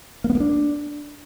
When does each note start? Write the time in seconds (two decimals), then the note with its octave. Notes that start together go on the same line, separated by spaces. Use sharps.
0.24 A#3
0.30 B3
0.35 A#3
0.40 D4